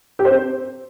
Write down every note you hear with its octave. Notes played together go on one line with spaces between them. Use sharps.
G4
C5
C4